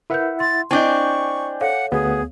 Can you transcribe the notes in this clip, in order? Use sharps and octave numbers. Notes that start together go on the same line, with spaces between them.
E4 A#4 B4 E5 F#5 G6
C6 A6
C4 D4 E4 D#5 G#5 C#6 D6 G6
A4 C#5 F5 F#5
D2 B3 G#4